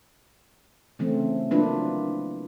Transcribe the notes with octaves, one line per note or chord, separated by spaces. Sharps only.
C#3 E3 A3 C4
F#3 A#3 D4 E4 F4 B4